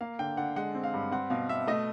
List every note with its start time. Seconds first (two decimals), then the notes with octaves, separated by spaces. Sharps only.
0.01 A#3 F5
0.19 D3 G5
0.37 D3 F#5
0.56 G#3 F#5
0.75 C4
0.84 F5
0.94 G2
1.12 C4 F#5
1.30 B2 F5
1.49 B2 E5
1.67 A3 D#5